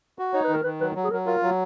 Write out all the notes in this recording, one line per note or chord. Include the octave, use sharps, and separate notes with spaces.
F#4
D#4 C#5
B4
D#3 A#4
D#3 B4
F#3 B4
F#3
G#4
F#3 A#4
F4 A#4
F#3